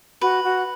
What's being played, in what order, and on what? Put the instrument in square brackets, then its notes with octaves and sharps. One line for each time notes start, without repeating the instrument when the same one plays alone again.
[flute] F#4 [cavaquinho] B4
[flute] F#4